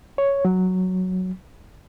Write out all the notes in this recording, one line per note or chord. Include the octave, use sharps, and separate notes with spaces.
C#5
F#3